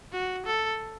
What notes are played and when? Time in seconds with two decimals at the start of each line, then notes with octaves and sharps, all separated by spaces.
0.13 F#4
0.46 A4